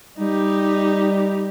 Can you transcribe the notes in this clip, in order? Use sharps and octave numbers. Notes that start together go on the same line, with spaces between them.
G3 D#4 G4